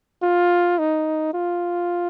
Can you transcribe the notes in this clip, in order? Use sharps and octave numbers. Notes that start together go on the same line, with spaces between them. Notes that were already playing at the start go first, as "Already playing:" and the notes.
F4
D#4
F4